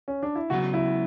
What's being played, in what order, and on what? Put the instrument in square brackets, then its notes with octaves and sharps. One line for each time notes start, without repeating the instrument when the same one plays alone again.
[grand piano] C#4
D4
E4
[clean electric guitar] C#2 C#3 F#3 B3 [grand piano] F#4
[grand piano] E4